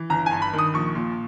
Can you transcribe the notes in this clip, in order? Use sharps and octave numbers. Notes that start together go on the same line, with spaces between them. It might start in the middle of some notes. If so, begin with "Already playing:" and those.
Already playing: E3
G1 A#5
G2 G#5
B5
D#3
D#6
A#1 C#6
A#2